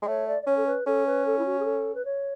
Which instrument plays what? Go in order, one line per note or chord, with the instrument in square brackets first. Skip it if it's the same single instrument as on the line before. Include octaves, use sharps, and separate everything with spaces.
[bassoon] G#3
[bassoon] A3 [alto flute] C#5
[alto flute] D5
D5
[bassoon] C#4 [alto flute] C#5
[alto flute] A4
B4
[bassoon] C#4 [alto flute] A4
[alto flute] B4
A4
E4
F#4
G#4
A4
B4
C#5